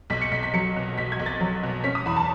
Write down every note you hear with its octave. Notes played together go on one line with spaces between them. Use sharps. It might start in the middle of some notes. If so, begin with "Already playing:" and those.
B1 B6
C#7
B1 B6
B6
F#3 C#7
B2
B1 B6
G#6
B1
A6
F#3
B2
C#4 B6
D#6
E2 B5
A5